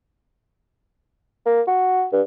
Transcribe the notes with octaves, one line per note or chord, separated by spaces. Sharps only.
A#3
F#4
G2